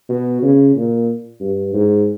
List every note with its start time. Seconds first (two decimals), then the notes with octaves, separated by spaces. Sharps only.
0.09 B2
0.42 C#3
0.76 A#2
1.40 G2
1.73 G#2